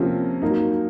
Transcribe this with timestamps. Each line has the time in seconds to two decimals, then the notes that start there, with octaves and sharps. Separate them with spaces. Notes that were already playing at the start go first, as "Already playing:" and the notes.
Already playing: C3 F3 A#3 C#4
0.42 F#3 A#3 D#4